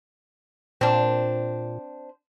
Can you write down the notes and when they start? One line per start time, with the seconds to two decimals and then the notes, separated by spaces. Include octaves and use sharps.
0.81 A#2 C4 D4